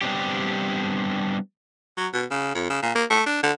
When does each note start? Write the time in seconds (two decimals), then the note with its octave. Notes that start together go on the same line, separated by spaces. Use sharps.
0.01 G3 B3 C4 D4 G4
1.97 F#3
2.13 B2
2.31 C#3
2.55 F2
2.70 C#3
2.82 A#2
2.95 A#3
3.10 A3
3.26 D4
3.43 D3